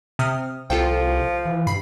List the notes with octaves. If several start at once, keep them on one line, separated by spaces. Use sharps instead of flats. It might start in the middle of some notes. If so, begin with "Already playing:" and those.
C3 D#6 F6
C2 F3 F4 A4 G5
E3
G2 B5 C7